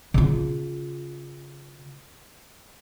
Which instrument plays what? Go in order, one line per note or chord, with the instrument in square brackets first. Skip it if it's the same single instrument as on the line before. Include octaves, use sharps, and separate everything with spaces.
[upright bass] C#3 F4